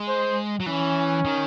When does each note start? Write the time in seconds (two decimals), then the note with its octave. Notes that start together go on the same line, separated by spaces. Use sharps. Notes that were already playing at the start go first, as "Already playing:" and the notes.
Already playing: G#3
0.09 C5
0.60 F#3
0.66 E3 C#4
1.25 D#3